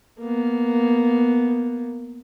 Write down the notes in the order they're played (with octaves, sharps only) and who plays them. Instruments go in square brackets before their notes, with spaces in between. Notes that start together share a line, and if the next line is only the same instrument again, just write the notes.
[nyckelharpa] A#3 B3